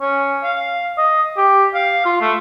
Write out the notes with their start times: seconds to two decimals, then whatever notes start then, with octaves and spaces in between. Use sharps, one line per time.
0.01 C#4
0.44 F5
0.98 D#5
1.37 G4
1.75 F5
2.05 F4
2.21 A3